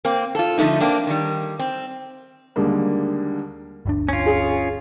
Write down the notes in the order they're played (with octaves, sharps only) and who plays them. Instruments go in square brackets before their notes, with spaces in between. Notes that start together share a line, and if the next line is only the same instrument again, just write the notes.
[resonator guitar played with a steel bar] A#3 C4
F4 A4
D3 F3 A3 B3 D#4
A#3 C4 D4
D#3 G3
C4
[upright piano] D#2 D3 G3 G#3 A#3
[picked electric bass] G1 D2 D4
[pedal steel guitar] C#4 F4
[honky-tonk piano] G#4